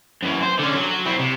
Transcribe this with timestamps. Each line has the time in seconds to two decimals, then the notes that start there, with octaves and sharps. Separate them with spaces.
0.23 F#2 E3
0.43 C5
0.59 D3 C#4
0.76 F#3
1.05 C4 E4
1.19 C3